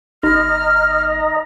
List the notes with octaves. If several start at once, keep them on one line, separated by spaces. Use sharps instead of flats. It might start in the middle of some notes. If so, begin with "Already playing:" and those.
G1 D#4 D#5 A#5 F6